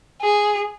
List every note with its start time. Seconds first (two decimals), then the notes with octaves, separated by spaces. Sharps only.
0.22 G#4